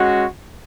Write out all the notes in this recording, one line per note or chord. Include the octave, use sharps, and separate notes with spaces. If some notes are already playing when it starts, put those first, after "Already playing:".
Already playing: G#3 C#4 F#4